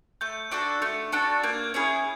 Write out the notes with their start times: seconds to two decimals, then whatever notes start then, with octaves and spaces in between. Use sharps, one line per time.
0.21 A3 G6
0.51 D4 F#4 A4
0.82 A3
1.12 D4 F#4 A4
1.43 A#3 G6
1.53 G#6
1.64 G6
1.74 C#4 E4 G#4